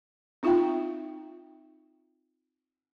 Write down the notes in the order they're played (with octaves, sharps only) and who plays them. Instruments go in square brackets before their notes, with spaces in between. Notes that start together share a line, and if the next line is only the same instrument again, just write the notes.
[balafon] C4 D#4 F4 E5 F5 G5